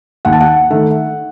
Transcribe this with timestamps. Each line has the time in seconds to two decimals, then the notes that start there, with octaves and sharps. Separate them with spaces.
0.25 D#2 F#5
0.33 A5
0.40 F#5
0.70 D#3 A3